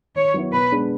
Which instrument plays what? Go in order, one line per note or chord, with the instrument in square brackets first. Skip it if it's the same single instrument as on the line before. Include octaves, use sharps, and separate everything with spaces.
[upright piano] D#3 [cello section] C#5
[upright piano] F#3 B3 E4
[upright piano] B2 [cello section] B4
[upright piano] G#3 B3 D4